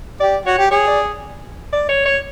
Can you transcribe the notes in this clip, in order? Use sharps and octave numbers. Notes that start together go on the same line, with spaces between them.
G4 D5
F#4 C#5
G4
G#4 C#5
D5
D5
C#5
C#5